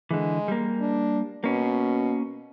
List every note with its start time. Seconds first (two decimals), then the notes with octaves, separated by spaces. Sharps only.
0.10 D3 E3 G#3
0.48 G3 A#3
0.81 D4
1.44 B2 A#3 C#4